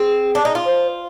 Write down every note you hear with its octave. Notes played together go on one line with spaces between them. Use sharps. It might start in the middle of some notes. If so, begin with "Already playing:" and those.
Already playing: C4 G#4
D4
D#4
F4
C5